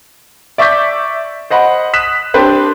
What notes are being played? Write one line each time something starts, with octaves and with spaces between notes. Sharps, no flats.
D5 E5 C#6 D6 G6 B6
C5 D#5 F#5 B5
D#6 F#6 B6 E7
C4 D4 G4 B4 C5